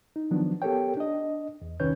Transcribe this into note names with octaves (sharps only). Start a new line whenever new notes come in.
D#4
D#3 F3 F#3 B3 D4
B3 G4 A4 A#4 C#5 G5
D4 D#5
E2
C2 D#3 C#4 B4 C#5 G6